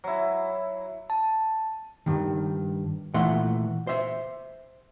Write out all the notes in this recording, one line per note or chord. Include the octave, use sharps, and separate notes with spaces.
F#3 E4
A5
G2 D#3
A#2 E3 A3 F#5 C6
C5 E5